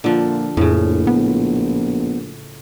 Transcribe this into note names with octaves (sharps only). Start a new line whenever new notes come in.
A#2 D3 F3
A#1 F2 A2 C#3
B3